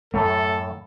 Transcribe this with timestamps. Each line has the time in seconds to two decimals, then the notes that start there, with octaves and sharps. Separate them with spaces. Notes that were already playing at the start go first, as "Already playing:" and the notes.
0.14 F#2 A2 A3 A4